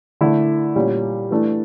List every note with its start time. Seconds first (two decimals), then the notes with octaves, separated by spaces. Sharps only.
0.21 D3 A3 E4
0.76 A#2 G3 C#4
1.31 E3 A3 D4